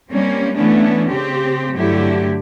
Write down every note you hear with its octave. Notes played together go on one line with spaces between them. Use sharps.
G3 A#3 C4 C#4
E3 A3 B3 C#4 D4 E4
C#3 C4 G4
G2 D3 F#3 A3 E4 G4